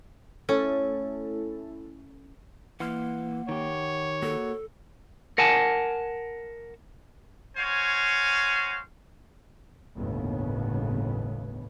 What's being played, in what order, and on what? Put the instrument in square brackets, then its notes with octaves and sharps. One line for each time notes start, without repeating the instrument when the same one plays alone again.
[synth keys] A3 E4 A4 [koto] C#4
[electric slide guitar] E3 [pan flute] A#3 [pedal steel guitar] F#5 C6 F6
[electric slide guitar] D#3 G4 [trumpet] C#5
[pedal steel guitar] A#3 F#4 [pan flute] A4
[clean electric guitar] A#4 F#5 G#5 A5
[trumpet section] F#4 C5 C#5 F5 G#5
[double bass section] G1 D#2 A2 C#3 B3